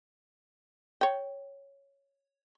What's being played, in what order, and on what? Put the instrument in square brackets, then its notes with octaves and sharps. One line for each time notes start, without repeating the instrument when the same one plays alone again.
[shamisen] C#5 G5